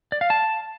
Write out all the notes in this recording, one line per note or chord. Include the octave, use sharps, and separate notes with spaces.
D5
F5
A5